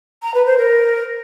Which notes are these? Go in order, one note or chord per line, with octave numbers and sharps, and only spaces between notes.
A#5
B4
C5
A#4